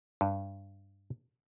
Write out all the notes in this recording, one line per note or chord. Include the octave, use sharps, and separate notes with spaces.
G2